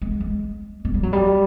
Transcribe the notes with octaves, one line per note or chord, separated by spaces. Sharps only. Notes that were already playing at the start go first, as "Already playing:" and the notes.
G#3
G#3
G#3
G3
F#3
G3